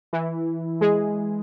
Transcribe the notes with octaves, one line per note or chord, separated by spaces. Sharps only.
E3 E4
G#3 G#4